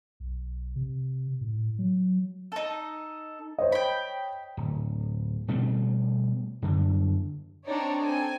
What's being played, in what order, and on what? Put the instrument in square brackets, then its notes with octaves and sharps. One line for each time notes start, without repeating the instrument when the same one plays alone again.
[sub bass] B1
C3
A2
F#3
[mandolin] D#4 A4
[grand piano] C5 C#5 D#5
[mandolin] G5 B5
[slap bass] D1
B2 G3 A3 C4
F#2 D3
[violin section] C4 D4 D#4 C#5 D5
C4 A4 G#5